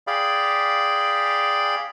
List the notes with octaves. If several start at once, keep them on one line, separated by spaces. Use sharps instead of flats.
G#4 D5 F5 G5 B5